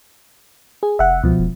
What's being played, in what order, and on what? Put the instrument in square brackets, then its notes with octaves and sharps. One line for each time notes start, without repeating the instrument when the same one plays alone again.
[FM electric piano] G#4
[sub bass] F1 [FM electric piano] E5 F#5
[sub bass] C#2 [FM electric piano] B2 F3
[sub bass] E1